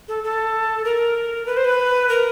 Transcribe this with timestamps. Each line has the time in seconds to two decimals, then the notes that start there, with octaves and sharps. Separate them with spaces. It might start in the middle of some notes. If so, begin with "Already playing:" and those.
0.08 A4
0.24 A4
0.85 A#4
1.46 B4
1.57 C5
1.65 B4
2.09 A#4